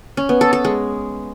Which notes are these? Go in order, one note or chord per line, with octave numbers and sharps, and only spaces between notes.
C#4
B3
A4
A4
G#3